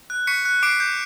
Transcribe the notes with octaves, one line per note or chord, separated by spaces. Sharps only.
F#6
C#6 B6 C#7
F#6
D6 C7 D7
G6